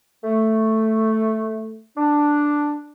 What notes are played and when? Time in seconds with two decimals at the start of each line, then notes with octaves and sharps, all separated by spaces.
0.24 A3
1.97 D4